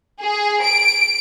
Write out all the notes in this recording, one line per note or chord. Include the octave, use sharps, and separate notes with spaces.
G#4
D7